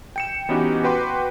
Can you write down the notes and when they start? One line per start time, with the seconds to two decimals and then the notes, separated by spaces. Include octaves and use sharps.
0.16 G5 C#7 E7
0.49 E3 B3 C#4 D#4 F#4 G4
0.83 F#4 B4 G5 C6 D6